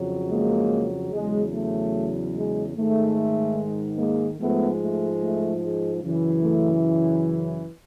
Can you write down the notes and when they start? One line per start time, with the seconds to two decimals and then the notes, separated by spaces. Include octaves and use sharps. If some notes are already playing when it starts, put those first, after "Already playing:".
Already playing: F2 C#3 F#3
0.28 G#3 A#3
1.11 E2 C#3 F#3 G#3
1.51 A3
2.34 G#3
2.75 G#2 D#3 G#3 A3
3.98 G#3 A#3
4.38 G#2 F3 G#3 A3 B3
4.79 A3
5.21 A3
5.62 G#3
6.02 F#2 C#3 E3
6.43 A3